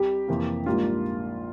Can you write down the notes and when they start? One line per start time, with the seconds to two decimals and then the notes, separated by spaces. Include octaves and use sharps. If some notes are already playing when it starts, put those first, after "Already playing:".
Already playing: C2 C3 G3 G4
0.28 F2 C3 E3 A#3
0.66 A#1 G#2 G3 A#3 F4